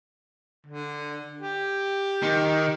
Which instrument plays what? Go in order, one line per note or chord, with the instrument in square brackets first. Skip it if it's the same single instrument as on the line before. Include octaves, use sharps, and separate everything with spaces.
[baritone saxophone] D3
G4
[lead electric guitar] D#3